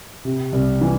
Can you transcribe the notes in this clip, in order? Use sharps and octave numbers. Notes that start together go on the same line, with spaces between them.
C3
C2
E3